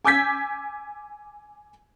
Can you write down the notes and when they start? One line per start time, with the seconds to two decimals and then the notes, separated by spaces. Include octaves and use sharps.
0.05 G#5 D6 E6 G6 G#6 B6